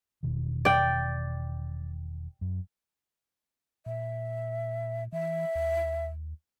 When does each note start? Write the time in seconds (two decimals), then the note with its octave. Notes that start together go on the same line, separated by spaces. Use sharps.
0.23 E1 B2 D#3
0.65 D5 G5
2.41 F#2
3.86 A#2 E5
5.13 E3 E5
5.55 D#2